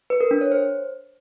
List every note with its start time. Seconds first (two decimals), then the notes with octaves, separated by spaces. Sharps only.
0.10 B4
0.21 A#4
0.31 D4
0.41 C#5
0.52 C5